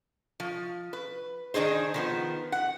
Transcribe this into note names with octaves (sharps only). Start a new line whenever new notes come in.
F3
B4
D#3 D4 D#4 G#4 C5
D#3 F3 B3
F#5